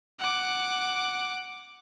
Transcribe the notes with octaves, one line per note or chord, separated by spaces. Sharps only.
F#5 D6